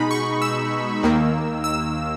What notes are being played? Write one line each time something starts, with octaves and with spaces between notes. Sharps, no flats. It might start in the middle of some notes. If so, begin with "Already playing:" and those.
Already playing: B2 G#3 D#4 B5
C#6
E6
D#2 D#3 A#3
E6